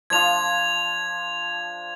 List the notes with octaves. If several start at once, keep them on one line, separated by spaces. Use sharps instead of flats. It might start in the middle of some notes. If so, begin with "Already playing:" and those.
F3 D4 F4 G#6 F7